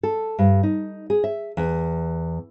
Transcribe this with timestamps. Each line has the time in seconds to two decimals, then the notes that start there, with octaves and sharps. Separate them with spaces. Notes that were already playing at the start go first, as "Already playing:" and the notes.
0.03 A4
0.38 G2
0.63 D#4
1.10 G#4
1.24 E5
1.57 E2